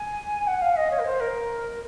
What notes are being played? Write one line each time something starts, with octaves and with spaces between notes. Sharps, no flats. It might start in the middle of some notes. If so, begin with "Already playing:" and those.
Already playing: G#5
F#5
F5
D#5
C#5
A#4
C5
A#4